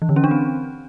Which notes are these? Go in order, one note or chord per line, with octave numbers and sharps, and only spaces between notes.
E3
D3
C#4
D4
C4